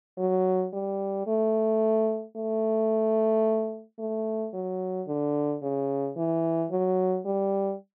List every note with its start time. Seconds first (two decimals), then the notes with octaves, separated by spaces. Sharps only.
0.18 F#3
0.73 G3
1.27 A3
2.36 A3
3.99 A3
4.54 F#3
5.08 D3
5.62 C#3
6.17 E3
6.71 F#3
7.25 G3